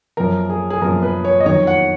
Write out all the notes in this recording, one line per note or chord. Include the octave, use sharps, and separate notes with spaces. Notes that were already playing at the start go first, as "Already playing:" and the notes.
F#2 F3 A#4
G#4
G#4
F#2 F3 A#4
B4
C#5
D#5
F2 D#3 F#3 C#5
F#5